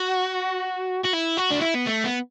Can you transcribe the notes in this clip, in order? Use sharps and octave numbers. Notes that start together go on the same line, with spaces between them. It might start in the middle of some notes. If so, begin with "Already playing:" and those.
Already playing: F#4
F#4
E4
F#4
D4
E4
B3
A3
B3